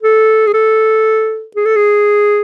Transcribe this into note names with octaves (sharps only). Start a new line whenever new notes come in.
A4
G#4
A4
G#4
A4
G#4